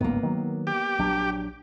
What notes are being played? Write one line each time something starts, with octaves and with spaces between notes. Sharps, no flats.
G1 C#2 G#2 A#3 B3
D#3 F#3
G4
A#1 F#3 D4